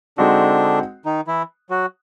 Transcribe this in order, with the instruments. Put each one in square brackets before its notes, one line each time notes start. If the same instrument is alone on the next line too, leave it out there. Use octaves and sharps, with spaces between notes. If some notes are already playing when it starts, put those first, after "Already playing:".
[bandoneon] D3 D4 [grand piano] G#3 C4 D#4 F#4
[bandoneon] D#3 D#4
E3 E4
F#3 F#4